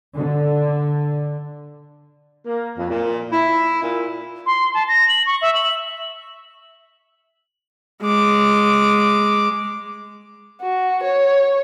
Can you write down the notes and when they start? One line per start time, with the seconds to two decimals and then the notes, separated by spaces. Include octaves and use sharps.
0.14 D3
2.46 A#3
2.77 F2
2.90 A#2
3.32 E4
3.82 A#2
4.46 C6
4.74 A5
4.88 A#6
5.08 F#7
5.26 C#6
5.42 E5
5.55 F#7
8.02 G#3 D6
10.62 F#4
11.03 C#5